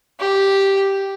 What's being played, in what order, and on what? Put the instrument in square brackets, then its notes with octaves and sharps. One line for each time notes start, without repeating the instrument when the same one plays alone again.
[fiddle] G4